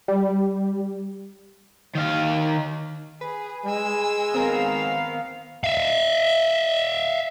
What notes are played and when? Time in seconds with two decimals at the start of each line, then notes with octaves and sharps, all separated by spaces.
0.08 G3
1.95 D#3 F5
3.21 G#4 B4
3.66 G#3 G#5 E6
4.34 D#3 B3 C4 A#4 F5
5.64 E5 F5